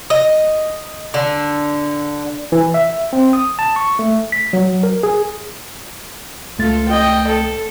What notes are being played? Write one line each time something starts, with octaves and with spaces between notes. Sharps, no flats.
D#5
D3
E3
E5
C4
D#6
A5
C#6
A3
B6
F#3
A#4
G#4
C#2 A3 F4 A4 A6
D#5 G5
A4